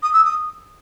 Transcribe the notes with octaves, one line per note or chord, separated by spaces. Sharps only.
D#6
E6
D#6